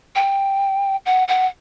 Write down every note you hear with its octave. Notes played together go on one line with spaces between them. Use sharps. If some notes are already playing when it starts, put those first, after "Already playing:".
G5
F#5
F#5